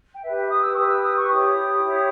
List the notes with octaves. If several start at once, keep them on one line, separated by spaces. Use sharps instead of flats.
G5
G4 B4 E5
E5
D#6
E6
C#6
G4 B4 D#6
E6
D#6
C#6
E4 G4 C#5 D#6
E4 G4 C#5